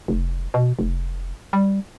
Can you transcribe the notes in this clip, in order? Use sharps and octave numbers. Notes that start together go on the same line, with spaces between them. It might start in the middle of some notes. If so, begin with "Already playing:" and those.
F1
B2
F1
G3